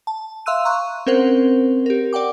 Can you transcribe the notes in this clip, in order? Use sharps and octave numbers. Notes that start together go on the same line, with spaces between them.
A5
E5 F5 C6 E6 F#6 D#7
A#5 C6 C#6 F#6
C4 C#4 A#4 C5 F#5
G4 A#4
D5 F#5 G5 D6